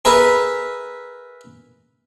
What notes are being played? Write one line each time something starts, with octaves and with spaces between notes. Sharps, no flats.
G#4 A#4 B4 E5